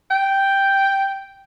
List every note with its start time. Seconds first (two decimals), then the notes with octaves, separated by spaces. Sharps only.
0.11 G5